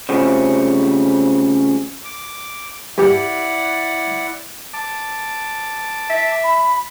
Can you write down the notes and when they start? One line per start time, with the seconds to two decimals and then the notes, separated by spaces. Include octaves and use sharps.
0.09 C#3 F3 G3 A3 C4 C#4
2.04 D6
2.98 G2 E4 G4 D5 F#5
4.74 A5 D6
6.10 E5
6.44 B5